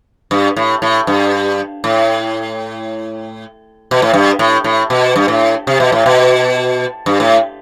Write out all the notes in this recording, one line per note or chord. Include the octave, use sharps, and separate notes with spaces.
G2
A2
A2
G2
A2
B2
A2
G2
A2
A2
B2
G2
A2
C3
B2
A2
B2
G2
A2